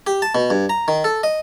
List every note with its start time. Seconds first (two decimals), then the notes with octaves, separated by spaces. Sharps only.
0.07 G4
0.22 A5
0.35 B2
0.50 G2
0.69 A#5
0.88 D#3
1.04 A4
1.23 D#5